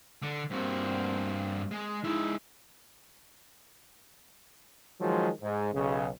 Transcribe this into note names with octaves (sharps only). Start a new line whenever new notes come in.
D3
G2 A#3 C4 F#4
G#3
G#3 D#4 E4 E5
D#3 F3 F#3 G#3
G#2
B1 C#3